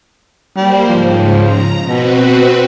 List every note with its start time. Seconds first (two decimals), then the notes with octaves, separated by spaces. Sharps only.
0.57 G3 A#3 C5
0.89 G#2 C#3 F3
1.41 A#5
1.87 B2 C4 F#4 B4